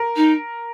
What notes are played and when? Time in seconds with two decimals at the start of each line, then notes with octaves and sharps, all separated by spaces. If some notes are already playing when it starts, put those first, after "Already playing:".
Already playing: A#4
0.16 D#4